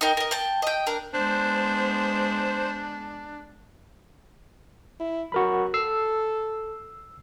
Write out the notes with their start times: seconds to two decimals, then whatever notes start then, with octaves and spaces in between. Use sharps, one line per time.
0.01 D#4 A#4 G5
0.17 A#4 D#5
0.31 G5 A5
0.62 D#5 G5
0.86 D4 A#4
1.14 G#3 B3 D4 C5
5.00 E4
5.32 F#3 F#4 A#4 B5
5.74 A4 E6 C7